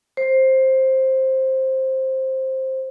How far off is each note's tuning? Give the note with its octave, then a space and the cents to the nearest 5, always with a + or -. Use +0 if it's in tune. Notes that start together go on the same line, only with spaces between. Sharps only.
C5 +10